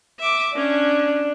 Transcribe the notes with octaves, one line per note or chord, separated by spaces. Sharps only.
E5 D6
C#4 D4